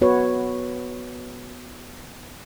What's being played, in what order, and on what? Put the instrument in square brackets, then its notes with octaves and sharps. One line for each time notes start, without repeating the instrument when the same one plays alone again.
[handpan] B3 F#4 B4 C#5